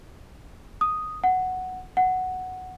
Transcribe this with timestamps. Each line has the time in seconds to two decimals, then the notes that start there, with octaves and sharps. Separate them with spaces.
0.81 D#6
1.24 F#5
1.97 F#5